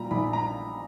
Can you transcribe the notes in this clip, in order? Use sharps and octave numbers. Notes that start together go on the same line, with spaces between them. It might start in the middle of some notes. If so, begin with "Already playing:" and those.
Already playing: A#2 G3 A#5 B5
A#1 B5
A#5